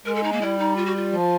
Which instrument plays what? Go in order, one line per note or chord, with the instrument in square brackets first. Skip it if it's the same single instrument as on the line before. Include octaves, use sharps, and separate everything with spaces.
[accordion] G#3 [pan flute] A#4
[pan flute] A4
D#4
A#3
[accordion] G3 [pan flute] E4
[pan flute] D#4
F4
F#4
F4
[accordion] F3